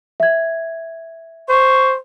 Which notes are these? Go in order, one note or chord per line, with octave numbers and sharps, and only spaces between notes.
E5 G#6
C5 C#6